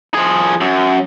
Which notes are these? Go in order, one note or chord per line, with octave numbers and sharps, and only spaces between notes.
F3 G#4
F#2